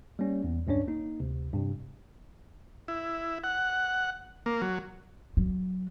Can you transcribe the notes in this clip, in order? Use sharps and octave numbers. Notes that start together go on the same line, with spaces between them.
G3 A#3 C#4
E2
C#2 G2 C#4 D4 C#5
A#3 D#4
D2 C3
G2 C3
E4
F#5
A#3
F#3
F#3